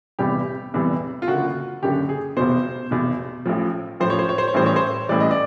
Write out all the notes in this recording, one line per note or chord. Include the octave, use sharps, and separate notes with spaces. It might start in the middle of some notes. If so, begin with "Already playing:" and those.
F1 E2 C3 E3 G3 G4
F1 E2 C3 E3 G3
F4
F#1 F#2 D3 F#4
F#1 F#2 D3 G4
G#4
F1 E2 B2 C5
F1 E2 B2
A1 A2 F3
A1 A2 F3 C5
C#5
C5
C#5
C5
C#5
A1 A2 E3 G3 C5
C#5
C5
A1 A2 E3 G3 D5
D#5
D5